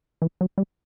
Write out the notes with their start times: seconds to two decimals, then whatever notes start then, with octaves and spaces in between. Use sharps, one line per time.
0.22 E3
0.41 F#3
0.58 G3